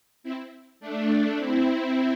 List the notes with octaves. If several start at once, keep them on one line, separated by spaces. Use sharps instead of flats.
C4 E4
A3 D4
C4 E4